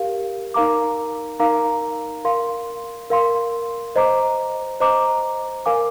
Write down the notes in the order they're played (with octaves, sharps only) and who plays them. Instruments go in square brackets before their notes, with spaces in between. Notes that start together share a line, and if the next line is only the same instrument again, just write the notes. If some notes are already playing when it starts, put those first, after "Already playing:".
Already playing: [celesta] G4 A#4 F5
D#4 A#4 F5 A#5 D6
D#4 A#4 F5 A#5 D6
A#4 F5 C6
A#4 F5 C6
C5 D#5 A#5 D6
C5 D#5 A#5 D6
A#4 F5 G#5 D6